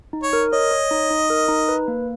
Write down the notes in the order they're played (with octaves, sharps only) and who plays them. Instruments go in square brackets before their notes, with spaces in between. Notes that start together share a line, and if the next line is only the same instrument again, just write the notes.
[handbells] D#4
[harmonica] C#5
[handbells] A#4
[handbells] C#5 [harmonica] D#5
[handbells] C#5
D#4
D#4
A#4
D#4
B4
A#3